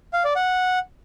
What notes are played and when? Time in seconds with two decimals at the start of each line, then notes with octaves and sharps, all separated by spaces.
0.13 F5
0.24 D5
0.36 F#5